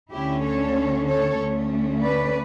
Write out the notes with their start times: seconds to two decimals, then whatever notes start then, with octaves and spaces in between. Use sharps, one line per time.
0.11 D2 D3 A3 C#4 E4 G4
0.43 A4 C#5
1.07 A4 C#5
1.39 D2 D3 A3 C#4
2.02 B4 D5